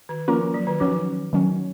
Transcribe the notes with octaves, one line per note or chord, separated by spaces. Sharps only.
D#3
F3 A#3 C#4 F4 A#4
F#3
D#3
D#3 F3 F#3 C#4
D#3 F#3 C#4